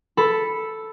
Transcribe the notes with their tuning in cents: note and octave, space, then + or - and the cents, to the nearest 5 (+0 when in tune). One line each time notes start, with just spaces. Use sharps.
A4 +0 B5 +0